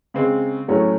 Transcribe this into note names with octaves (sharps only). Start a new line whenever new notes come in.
C#3 G#3 C4
A2 F#3 A3 C#4